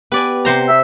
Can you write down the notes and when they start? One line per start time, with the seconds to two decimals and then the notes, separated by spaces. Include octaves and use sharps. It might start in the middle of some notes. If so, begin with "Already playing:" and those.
0.12 B3 G4 B4 D5 G#5
0.45 C3 C5 A#5
0.68 E5